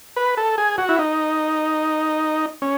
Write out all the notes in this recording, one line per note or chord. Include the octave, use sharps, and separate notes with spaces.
B4
A4
G#4
F#4
E4
D#4
C#4